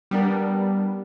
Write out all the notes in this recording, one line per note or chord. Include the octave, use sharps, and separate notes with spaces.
G3 B3 D4 A#4